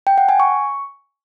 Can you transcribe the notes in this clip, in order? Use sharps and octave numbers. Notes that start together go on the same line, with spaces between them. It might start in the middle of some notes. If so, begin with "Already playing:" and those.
G5
F#5
G#5
C#6